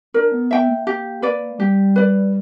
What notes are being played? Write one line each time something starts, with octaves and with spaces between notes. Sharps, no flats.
D4 A#4
B3
B3 E5 G5
A#3
G4
B4 D5
G3 G4
B4 D5